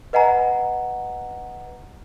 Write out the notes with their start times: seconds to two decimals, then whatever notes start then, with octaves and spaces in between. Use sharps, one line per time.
0.13 B4 D#5 F#5 G#5 A#5